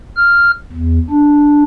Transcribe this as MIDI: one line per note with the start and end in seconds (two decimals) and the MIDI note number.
0.16 0.51 89
0.72 0.99 40
1.10 1.63 62